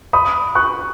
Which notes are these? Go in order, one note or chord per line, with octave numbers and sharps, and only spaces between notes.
B5 D#6
C#6 F#6